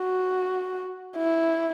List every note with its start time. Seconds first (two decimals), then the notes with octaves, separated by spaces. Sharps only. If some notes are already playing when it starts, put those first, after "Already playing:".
Already playing: F#4
1.17 E4